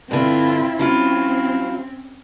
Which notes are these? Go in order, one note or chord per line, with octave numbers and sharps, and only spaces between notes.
G2 D3 C4 E4 F4
F#3 C4 C#4 E4 F4